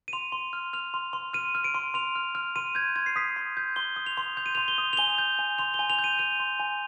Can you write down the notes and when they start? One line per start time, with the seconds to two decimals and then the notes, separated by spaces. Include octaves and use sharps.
0.08 D#7
0.13 C6 F7
0.32 C6
0.53 F6
0.73 F6 F7
0.94 C6
1.13 C6
1.33 F6 D#7
1.55 F6
1.64 D7
1.75 C6
1.94 C6 F7
2.16 F6
2.35 F6
2.56 C6 D#7
2.75 G6 G#6
2.96 C6 G#6
3.06 C7
3.16 D#6 B6
3.36 C6
3.57 G6
3.76 C6 G7
3.96 D#6
4.06 F7
4.18 C6
4.37 G6 F7
4.46 D#7
4.55 F7
4.57 C6
4.68 G7
4.78 D#6
4.93 F7
4.97 G#5 G7
5.18 G6
5.39 G#5
5.58 C6 F7
5.74 G7
5.79 G#5
5.90 F7
5.99 G6
6.04 D#7
6.19 G#5 F7
6.40 C6
6.60 G#5